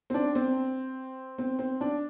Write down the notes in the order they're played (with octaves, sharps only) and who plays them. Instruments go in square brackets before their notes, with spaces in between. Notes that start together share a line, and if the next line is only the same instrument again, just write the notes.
[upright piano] C4
D4
C4
C4
C4
D4